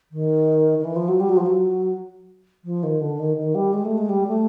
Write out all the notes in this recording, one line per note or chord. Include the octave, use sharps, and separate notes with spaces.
D#3
D#3
E3
F3
F#3
G3
F#3
F3
F#3
F3
D#3
D3
D#3
D#3
G3
G#3
A3
G#3
G3
A3